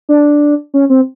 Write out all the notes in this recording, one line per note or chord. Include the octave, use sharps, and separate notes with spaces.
D4
C#4
C4